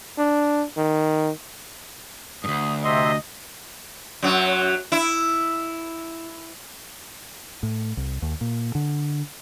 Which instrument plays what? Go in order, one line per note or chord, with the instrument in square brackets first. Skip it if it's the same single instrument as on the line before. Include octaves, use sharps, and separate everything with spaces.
[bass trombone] D4
D#3
[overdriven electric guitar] D2 G2 [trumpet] D#6
[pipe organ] C3 E5 C6 [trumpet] D#5
[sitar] F#2 F#3
E4
[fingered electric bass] A2
C2
D#2
A#2
D3